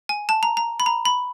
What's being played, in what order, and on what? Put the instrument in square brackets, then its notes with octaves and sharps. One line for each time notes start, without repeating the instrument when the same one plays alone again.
[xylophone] G#5
A5
A#5
A#5
B5
A#5
B5